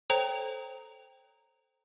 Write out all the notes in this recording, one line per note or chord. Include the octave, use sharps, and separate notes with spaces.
A4 C5 C#5 G5 A#5